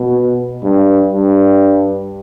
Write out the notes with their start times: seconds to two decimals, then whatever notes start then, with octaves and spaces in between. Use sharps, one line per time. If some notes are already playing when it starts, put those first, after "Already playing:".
Already playing: B2
0.63 G2
1.13 G2